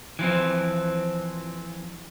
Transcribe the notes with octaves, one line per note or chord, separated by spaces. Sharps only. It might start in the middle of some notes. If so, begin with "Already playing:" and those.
E3 F3 C4